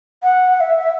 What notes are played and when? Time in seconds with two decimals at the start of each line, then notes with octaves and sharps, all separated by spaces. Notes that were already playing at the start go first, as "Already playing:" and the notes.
0.23 F#5
0.56 F#5
0.60 E5